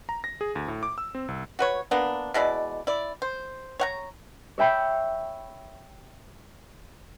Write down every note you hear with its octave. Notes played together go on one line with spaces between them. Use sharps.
A#5
A#6
G#4
D2
A2
D6
E6
C4
C2
F#4 B4 C#5
A#3 B3 D4
B2 G#3 E4 D5
E4 D5
C5
C#5 F#5 A#5
C#5 E5 G5 B5